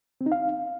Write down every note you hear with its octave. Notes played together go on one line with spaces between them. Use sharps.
C4
D#4
F5